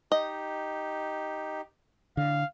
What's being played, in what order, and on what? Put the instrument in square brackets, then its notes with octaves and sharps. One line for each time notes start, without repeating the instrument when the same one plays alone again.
[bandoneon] D#4 G4 [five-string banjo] D#5
[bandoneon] A2 [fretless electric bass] D3 [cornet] F5